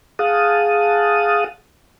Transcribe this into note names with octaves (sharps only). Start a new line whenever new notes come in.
G#4 F5 F#5 A5 D#6